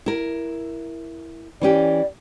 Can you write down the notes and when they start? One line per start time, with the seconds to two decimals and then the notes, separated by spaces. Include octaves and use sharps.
0.06 E4 A#4
1.61 E3 C#4 G4 D5